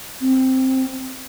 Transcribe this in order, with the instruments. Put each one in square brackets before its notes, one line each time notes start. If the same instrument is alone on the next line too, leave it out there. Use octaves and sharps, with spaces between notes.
[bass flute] C4